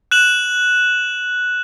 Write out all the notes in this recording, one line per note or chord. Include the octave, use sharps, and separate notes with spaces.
F#6 E7 F#7